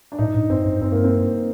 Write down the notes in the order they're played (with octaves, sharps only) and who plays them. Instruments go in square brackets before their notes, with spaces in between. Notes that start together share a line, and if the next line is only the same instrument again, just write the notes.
[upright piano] D4
[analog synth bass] A2 [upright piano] D#4
[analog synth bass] A2
[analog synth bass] G2 [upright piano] C4
[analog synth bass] G2
[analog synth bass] G2 [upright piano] C4
[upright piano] A#3
C4